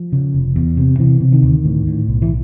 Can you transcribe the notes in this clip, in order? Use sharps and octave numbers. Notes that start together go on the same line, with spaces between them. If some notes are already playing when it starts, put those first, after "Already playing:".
Already playing: F3
C#3
F1
E2
C3
C3 E3
C3
D#3
D2
A2
A2
B1
E3